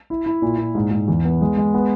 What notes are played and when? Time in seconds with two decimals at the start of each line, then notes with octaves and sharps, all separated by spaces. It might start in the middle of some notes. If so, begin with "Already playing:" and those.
0.10 E4
0.26 E4
0.42 A#2
0.58 A#2
0.75 G#2
0.91 G#2
1.08 E2
1.25 B3
1.41 G#3
1.57 G#3
1.74 B3